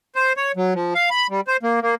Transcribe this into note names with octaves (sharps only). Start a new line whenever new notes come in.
C5
C#5
F#3
F3
F5
B5
G3
C5
A#3
A#3